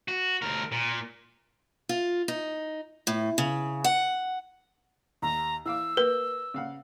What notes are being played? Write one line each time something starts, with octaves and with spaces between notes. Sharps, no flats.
F#4
D2 A#4
A#2
F4
D#4
A2
C#3
F#5
D#2 A#5
E3 F5 D6 E6
A#3 B4
C#3 F5 F#5